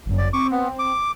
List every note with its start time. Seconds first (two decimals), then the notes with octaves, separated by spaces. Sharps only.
0.05 G1 F#2
0.18 D5
0.33 C4 C#6 D6
0.51 B3
0.79 D6